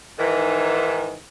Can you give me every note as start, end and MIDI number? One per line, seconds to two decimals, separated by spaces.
0.19 1.16 44
0.19 1.16 51
0.19 1.16 52